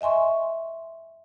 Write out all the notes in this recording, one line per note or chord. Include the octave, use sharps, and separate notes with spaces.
D#5 E5 G#5 C6 C#6